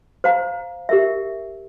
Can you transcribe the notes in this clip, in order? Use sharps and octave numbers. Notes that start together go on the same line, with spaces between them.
C5 F5 A#5
G4 A#4 E5